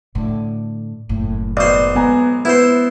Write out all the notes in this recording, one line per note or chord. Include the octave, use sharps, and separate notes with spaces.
A2 D3
F#1 A2
B1 C5 D5
G#3 B3 G#5 A#5
B3 E4 B4 C5